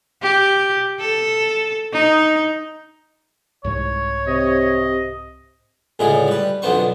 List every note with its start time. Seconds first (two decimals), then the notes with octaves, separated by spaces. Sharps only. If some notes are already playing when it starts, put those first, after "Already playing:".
0.23 G4
1.00 A4
1.93 D#4
3.64 C2 G#2 G#3 C#5
4.27 C3 D#5
5.99 C#2 A2 D3 G#3 G#4
6.27 G3 B4
6.62 B1 F2 D3 B3 C5 C#6